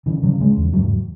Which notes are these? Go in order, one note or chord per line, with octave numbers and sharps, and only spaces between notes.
C#3 E3
C#3 F#3
C#3 G#3
E2
G#2 F#3